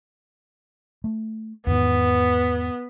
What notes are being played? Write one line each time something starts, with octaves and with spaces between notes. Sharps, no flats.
A3
E2 G#2 D#3 B3